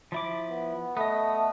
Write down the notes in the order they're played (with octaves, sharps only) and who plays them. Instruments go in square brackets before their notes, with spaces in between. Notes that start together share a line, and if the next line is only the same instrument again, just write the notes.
[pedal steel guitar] F3 E4 D6
[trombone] B3
[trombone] A3 [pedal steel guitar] B3 D#5